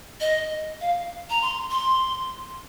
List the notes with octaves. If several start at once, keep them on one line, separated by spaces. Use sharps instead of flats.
D#5
F5
A#5
C6
C6